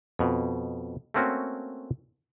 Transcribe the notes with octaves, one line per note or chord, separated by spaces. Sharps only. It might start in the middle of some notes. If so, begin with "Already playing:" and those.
F2 B2
A3 A#3 C4 C#4 F#4